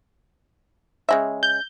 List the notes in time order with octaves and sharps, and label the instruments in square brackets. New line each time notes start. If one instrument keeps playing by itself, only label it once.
[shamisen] C#3 G#3 E5
[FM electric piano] G6